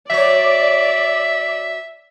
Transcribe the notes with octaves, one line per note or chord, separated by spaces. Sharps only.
F#3 C#5 D5 E5